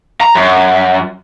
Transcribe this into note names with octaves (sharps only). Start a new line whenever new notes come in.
A#5
F#2